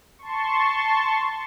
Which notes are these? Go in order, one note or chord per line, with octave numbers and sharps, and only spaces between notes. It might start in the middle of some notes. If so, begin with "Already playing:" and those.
A5 C6 C#6